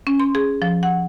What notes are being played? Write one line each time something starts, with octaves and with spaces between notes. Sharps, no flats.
C#4
C6
G#4
F3
F#5